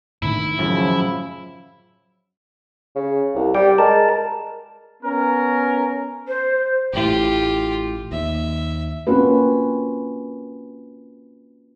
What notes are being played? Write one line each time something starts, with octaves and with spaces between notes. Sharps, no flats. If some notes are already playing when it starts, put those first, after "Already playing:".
A2 D3 D#3 E4
F#2 C#3 F3
C#3
C2
G3 G5
G#3 A#4 A5
B3 C#4 A#4
C5
A1 A2 F4 G4
D#2 E5
A#3 C4 C#4 F4 F#4 B4